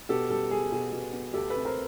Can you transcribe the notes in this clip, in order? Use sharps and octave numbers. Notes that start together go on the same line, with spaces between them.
B2 G4 A4
G3 G4 A4
G3 G#4
B2 G#4
B2
B3
D2 G4 A4
A4 B4
C3
A#4 C5